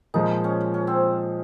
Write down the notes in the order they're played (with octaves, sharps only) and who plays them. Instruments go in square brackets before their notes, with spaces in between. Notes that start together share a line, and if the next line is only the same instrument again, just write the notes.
[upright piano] A#2 F3 G#3 [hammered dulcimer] D#4
[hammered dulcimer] C#4
C#4
C4